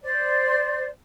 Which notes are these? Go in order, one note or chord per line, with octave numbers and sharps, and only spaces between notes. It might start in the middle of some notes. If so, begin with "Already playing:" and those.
C5 D5